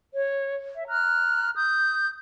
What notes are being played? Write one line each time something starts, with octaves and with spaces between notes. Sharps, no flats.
C#5
E5
A#5 F6 F#6
D#6 G6